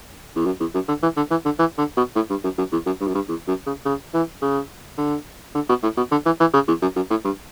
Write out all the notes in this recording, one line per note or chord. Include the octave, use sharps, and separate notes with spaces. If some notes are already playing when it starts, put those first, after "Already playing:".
E2
F#2
E2
F#2
D3
E3
D3
E3
D3
E3
D3
B2
A2
G2
F#2
F#2
E2
F#2
G2
F#2
G2
E2
F#2
C#3
C#3
E3
C#3
D3
D3
B2
A2
B2
D3
E3
E3
C#3
E2
F#2
F#2
A2
G2